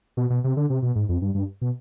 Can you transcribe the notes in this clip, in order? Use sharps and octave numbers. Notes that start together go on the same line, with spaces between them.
B2
B2
C3
D3
C3
B2
G#2
F2
G2
G2
B2